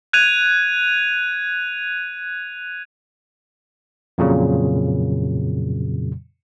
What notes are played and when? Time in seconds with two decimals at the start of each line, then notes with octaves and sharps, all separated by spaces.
0.13 F#6 G#6 D#7 F7
4.18 F2 A#2 C#3 F#3